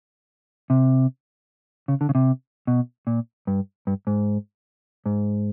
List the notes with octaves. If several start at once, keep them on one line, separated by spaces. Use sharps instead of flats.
C3
C#3
D3
C#3
C3
B2
A#2
G2
G2
G#2
G#2